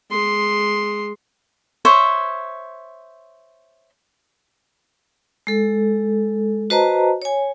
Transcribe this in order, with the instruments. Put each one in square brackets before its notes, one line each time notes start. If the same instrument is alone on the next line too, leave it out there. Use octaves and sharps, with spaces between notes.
[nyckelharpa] G#3 C6
[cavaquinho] C5 C#5 E5
[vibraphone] G#3 A4
F#4 B4 C5 D#5 A5 A#5
C#5 G#5